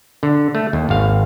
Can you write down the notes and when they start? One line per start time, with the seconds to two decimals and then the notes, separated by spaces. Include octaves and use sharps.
0.23 D3
0.55 A3
0.73 D#2
0.89 G#1 F5